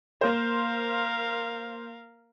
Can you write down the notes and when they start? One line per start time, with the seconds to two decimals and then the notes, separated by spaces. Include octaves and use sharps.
0.21 A#3 A#4 C5 F5